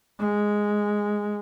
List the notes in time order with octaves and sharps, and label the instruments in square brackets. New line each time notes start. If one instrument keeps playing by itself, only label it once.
[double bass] G#3